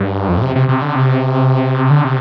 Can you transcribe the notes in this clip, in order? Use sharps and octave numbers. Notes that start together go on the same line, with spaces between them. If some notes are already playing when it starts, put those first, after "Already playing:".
Already playing: G2
F2
A2
C3
C3
C3
D3
C3
D3
C3